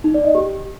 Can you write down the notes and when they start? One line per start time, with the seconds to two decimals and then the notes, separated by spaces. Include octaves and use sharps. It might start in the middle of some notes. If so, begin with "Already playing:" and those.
0.04 D#4
0.14 D5
0.24 D#5
0.35 G4